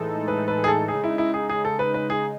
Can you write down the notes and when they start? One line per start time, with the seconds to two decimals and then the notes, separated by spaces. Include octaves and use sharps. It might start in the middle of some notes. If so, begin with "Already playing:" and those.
Already playing: A2 E3 G#3 D#4 A4
0.28 B4
0.48 B4
0.64 G#4
0.68 A4
0.88 C#3 G#3 D#4 G#4
1.04 E4
1.18 E4
1.34 G#4
1.49 G#4
1.65 A4
1.79 B4
1.94 B4
2.10 G#4